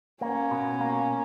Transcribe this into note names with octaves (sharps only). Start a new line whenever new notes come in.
A#3 C#4
B2
A#3